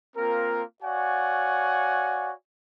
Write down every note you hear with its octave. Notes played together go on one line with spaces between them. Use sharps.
A#3 C4 F4 A#4
F#4 C#5 D5 F5 F#5 G#5